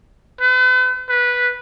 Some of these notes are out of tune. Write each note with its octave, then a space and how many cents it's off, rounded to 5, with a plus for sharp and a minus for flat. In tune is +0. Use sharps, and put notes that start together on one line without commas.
B4 +45
B4 -10